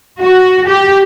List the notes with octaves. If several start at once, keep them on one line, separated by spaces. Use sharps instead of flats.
F#4
G4